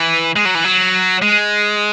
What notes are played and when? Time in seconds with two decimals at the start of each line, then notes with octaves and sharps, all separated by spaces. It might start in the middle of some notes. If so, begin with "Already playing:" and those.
Already playing: E3
0.36 G#3
0.45 F#3
0.55 E3
0.64 F#3
1.22 G#3